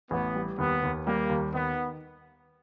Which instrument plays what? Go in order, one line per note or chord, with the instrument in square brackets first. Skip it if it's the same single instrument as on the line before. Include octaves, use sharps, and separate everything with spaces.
[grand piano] A1 [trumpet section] B3
[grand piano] G3
[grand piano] D#2 [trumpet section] B3
[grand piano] D#2
[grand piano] G3 [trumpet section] A#3
[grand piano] D#2
[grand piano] D#3 [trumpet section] B3